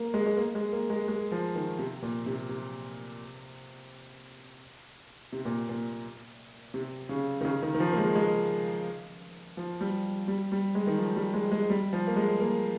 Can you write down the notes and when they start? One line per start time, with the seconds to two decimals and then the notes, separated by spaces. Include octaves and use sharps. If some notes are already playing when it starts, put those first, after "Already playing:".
Already playing: A#3
0.14 G#3
0.26 G#3
0.37 A#3
0.55 G#3
0.72 A#3
0.90 G#3
1.08 G#3
1.32 F3
1.55 D#3
1.79 C3
2.02 A#2
2.26 C3
2.49 C3
5.32 C3
5.45 A#2
5.69 A#2
6.74 C3
7.09 C#3
7.41 D#3
7.45 C#3
7.62 D#3
7.74 D#3
7.80 F3
7.92 A#3
7.98 G#3
8.15 G#3
9.57 F3
9.81 G3
10.28 G3
10.52 G3
10.75 G#3
10.87 D#3
10.98 F3
11.16 G3
11.34 G#3
11.51 G#3
11.70 G3
11.93 F3
12.07 A#3
12.16 G#3
12.40 A#3